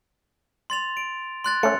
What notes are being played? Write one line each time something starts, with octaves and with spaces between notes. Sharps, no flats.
C6 A6 F7
D7
C6 F#6 A6
A3 C#4 C#7